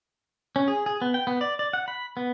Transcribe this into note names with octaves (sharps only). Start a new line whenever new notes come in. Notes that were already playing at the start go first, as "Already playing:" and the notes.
C#4
G#4
G#4
B3
G5
B3
D5
D5
F#5
B5
B3